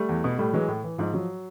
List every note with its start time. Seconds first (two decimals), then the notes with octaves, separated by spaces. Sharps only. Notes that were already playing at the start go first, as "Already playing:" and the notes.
Already playing: G3 A3
0.09 E2
0.24 B2
0.38 A2 G3 A3
0.53 E3 F#3 G#3
0.68 A2
0.83 E3
0.98 G#2 F3
1.14 F3 F#3